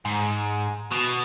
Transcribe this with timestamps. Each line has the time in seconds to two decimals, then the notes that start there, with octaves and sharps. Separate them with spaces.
0.05 G#2
0.92 B2